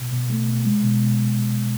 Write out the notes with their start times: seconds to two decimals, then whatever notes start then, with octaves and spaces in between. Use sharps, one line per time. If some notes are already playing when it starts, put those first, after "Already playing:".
Already playing: B2
0.11 B2
0.30 A3
0.47 B2
0.65 G#3
0.83 B2
1.01 B2